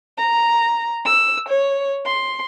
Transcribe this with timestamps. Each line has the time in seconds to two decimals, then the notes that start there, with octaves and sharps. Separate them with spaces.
0.17 A#5
1.05 E6
1.49 C#5
2.05 C6